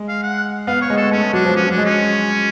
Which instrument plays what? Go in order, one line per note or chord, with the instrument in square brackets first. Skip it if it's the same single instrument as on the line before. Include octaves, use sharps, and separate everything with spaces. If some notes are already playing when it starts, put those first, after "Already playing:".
Already playing: [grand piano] G#3
[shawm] F5
F#5
[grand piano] B3 [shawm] F5
[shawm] C#5
[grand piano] G#3
[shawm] A4
[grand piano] A3 [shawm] C#4
[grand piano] G#3
[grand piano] F#3 [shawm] D4
[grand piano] F3
[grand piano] F#3 [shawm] C#4
[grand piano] F#3 [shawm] D4
[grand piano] G#3
[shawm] C#4